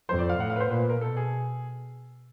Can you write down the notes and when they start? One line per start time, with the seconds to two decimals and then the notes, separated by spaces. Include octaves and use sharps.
0.09 F2 C5
0.19 D5
0.29 F5
0.39 A2 F#5
0.50 F5
0.56 B4
0.60 C5
0.70 A#2 B4
0.90 A#4
1.01 B2 A4
1.17 G#4